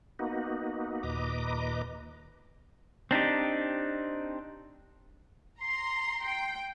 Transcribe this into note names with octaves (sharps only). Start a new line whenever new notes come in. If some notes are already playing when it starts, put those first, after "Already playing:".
A#3 B3 D#4 F#4
D#2 A#2 B4 D#5 A#5 D6
C4 D4 D#4 G4
A#5 C6 C7
G5